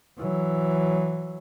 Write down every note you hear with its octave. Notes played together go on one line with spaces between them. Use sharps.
E3 F#3